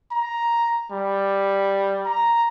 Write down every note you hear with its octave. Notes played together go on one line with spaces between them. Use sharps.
A#5
G3
A#5